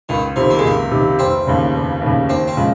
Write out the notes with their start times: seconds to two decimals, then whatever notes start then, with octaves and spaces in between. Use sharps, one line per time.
0.09 C#2 D#3
0.36 C3 D#3 F3
0.50 A#3
0.58 G#3
0.65 C#2 A#3
0.91 C3 D#3
1.19 F1 C4
1.47 D#2 C#3
1.74 F1
2.02 D#2 C#3
2.29 D#2 C4
2.48 C4
2.57 C#3 F3 G#3